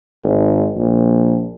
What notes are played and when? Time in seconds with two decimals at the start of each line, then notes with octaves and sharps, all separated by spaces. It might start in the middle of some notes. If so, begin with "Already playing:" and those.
0.24 G#1
0.76 A#1